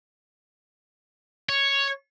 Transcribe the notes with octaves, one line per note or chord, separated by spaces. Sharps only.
C#5